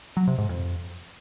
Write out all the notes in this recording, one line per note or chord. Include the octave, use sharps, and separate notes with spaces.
F#3
C3
G#2
F2